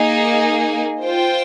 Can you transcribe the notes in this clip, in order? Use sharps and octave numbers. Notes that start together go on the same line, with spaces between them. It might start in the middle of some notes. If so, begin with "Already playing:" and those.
Already playing: A#3 D#4 G#4
F4 C5 G5